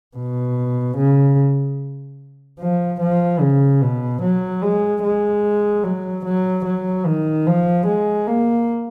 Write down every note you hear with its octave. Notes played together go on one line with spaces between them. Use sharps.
B2
C#3
F3
F3
C#3
B2
F#3
G#3
G#3
F#3
F#3
F#3
D#3
F3
G#3
A#3